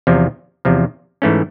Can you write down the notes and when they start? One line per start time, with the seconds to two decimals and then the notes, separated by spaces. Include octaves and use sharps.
0.07 E2 C3 F3
0.65 E2 C3 F3
1.22 G#2 E3 A3 C#4